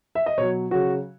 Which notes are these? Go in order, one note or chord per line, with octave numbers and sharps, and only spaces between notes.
E5
D#5
B2 F#3 C#5
C#3 F#3 F#4